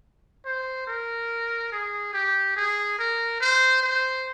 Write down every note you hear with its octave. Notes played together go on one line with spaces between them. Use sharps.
C5
A#4
G#4
G4
G#4
A#4
C5
C5